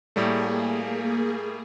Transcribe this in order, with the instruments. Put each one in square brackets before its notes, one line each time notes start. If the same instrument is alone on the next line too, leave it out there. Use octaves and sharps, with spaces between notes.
[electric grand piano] A2 G3 A3 [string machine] A#3 G#4